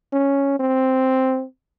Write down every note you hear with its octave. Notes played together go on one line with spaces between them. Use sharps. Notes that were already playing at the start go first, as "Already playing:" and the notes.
C#4
C4